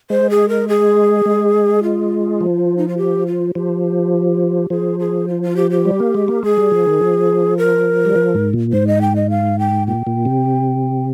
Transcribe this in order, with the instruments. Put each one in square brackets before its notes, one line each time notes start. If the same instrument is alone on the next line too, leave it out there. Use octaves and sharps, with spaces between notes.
[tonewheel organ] G#3 [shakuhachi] C5
[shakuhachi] G#4
A#4
G#4
[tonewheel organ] G#3
[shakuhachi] F4
[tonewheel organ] F3
[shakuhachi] D#4
F4
G4
F4
[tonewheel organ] F3 [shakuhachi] G4
[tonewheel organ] F3 [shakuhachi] G#4
[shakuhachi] G#4
F4
F4
G4
G4
[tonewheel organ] G3
A#3
G#3
A#3
[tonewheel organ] G#3 [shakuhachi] G#4
[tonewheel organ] G3
F3
D#3
F3
[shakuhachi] A#4
[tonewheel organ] G3
F3
G#2
A#2
[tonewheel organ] G#2 [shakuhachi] C5
[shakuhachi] D#5
G5
D#5
F5
G5
[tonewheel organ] A#2 [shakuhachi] G5
[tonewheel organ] A#2
C3